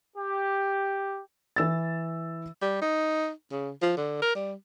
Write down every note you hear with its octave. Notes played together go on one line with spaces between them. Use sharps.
G4
E3 E6 A6
G3
D#4
C#3
F3
D3
A#4
G3